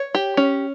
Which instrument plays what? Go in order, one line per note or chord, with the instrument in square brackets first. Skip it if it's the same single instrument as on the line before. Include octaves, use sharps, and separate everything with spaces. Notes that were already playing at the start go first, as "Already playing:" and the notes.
Already playing: [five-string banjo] C#5
G4
C#4